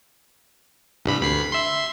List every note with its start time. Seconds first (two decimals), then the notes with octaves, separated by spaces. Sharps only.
1.05 C2 G2 B5
1.21 D2 B5 C7
1.52 E5 C6